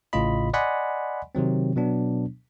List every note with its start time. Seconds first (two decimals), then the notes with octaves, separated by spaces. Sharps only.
0.13 A1 A2 C#3 F4 D#5 B5
0.54 D5 D#5 F#5 G#5 B5 C6
1.35 C3 D#3 F#3 C4
1.76 B2 F#3 B3 D4